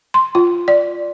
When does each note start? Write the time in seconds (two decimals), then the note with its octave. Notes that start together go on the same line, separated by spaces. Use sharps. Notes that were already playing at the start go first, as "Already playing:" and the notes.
0.14 C6
0.35 F4
0.68 D5